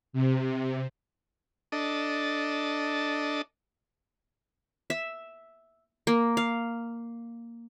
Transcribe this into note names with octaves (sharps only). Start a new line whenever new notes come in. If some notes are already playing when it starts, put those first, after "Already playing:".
C3
D4 A4 D#5
E5
A#3
F5